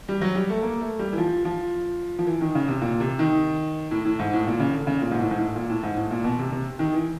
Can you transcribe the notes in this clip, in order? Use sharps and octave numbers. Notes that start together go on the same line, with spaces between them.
G3
F#3
G3
A3
A#3
A3
G3
E3
F3
F3
F3
E3
D#3
C#3
C3
A#2
C3
D#3
A2
A2
G#2
A2
A#2
C#3
D3
C#3
A#2
G#2
A2
G#2
A2
A#2
A2
G#2
A2
A#2
B2
C3
C3
D#3
E3